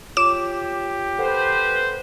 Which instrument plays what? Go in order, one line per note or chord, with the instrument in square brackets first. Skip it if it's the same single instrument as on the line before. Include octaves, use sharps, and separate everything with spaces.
[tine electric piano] F4 C#5 [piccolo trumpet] G4 [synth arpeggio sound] D6 E7
[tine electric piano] A4 F#5 [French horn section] B4 C5